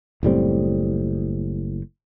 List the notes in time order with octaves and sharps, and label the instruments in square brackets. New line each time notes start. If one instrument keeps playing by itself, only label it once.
[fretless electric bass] F#1 A2 G3 C4